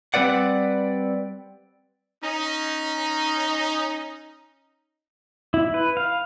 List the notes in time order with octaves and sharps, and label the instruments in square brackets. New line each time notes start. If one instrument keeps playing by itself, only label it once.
[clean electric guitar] G3 C4 B4 D5 F#5
[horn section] C#4 D#4
[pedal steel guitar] E4
B4
F5